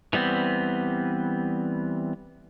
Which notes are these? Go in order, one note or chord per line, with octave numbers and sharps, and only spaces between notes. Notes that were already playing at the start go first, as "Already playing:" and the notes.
E3 G3 B3 C4